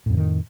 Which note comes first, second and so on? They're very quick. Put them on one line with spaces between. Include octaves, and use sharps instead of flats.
A2 F2 C3 D#3